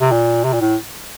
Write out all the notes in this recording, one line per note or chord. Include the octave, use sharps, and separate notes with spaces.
C3
A#2
C3
A#2
A2